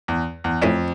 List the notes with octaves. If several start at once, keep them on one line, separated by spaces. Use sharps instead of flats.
E2
E2
A1 F2 A2 E3 A3 D4